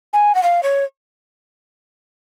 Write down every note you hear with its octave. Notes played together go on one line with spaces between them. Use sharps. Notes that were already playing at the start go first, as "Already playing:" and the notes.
G#5
F#5
F5
C#5